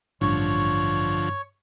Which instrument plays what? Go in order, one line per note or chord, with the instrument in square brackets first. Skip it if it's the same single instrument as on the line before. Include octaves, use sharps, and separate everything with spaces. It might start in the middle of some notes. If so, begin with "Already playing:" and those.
[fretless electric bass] A1 [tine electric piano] G2 C#6 [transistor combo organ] D3 F3 [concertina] C#5